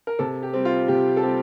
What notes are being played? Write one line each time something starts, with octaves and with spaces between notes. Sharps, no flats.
A#4
C3 A4
G4
G3 C4
F4
C3 G4
A4
G3 C4 G4